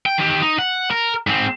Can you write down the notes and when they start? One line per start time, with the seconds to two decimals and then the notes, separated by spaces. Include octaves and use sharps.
0.06 G5
0.18 D#3 G4
0.42 D#4
0.59 F#5
0.91 A#4
1.27 G#2 C4